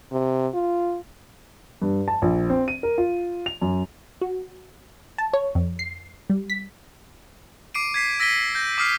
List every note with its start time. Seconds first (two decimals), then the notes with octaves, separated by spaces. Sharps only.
0.12 C3
0.54 F4
1.82 G2
2.08 A5
2.22 A#1
2.50 C4
2.68 D#7
2.83 A#4
2.98 F4
3.46 F7
3.62 F#2
4.22 F#4
5.18 A5
5.33 C#5
5.55 F2
5.79 C7
6.30 G3
6.50 B6
7.75 D6 C7 D7 D#7
7.94 G#6 B6 C7
8.20 E6 A#6 B6 D7 D#7 G7
8.55 G6 A#6
8.78 D6 D#6 F6 C7